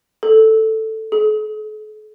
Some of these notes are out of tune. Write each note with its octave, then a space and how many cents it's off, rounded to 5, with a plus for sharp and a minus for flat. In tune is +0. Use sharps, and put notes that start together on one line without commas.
A4 +5
A4 -45